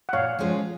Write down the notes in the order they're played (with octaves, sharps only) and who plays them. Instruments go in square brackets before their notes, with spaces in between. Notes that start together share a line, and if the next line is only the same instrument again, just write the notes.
[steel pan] F#5
[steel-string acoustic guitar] A#2 [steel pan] C#5 F5
[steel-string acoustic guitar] F3 G#3 C#4 F4